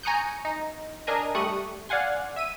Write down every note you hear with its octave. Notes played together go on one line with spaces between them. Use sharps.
G#5 A#5 C#6 D#6 F#6 G6
D#4
D4 A#4 D#5 G#5 A#5
G3 A3 C#6 D#6 F#6
D5 F5 F#5 G#5 C6
E5 B6 D#7